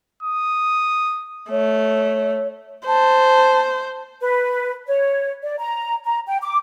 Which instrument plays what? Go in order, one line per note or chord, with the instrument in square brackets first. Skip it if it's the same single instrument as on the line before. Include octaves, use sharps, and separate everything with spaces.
[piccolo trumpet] D#6
[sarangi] A3 [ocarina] C#5
[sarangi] C5 [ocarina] A5
[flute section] B4
C#5
D5
A#5
A#5
G5
D6